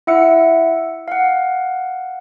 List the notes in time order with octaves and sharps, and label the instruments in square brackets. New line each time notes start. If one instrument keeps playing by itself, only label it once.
[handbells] E4 E5 F#5 E6 C#7
F5 F#5